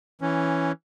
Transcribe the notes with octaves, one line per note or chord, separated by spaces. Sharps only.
E3 C#4